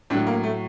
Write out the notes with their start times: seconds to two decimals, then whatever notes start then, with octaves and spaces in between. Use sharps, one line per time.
0.10 A2 D4
0.15 F#3
0.27 A#3
0.43 A3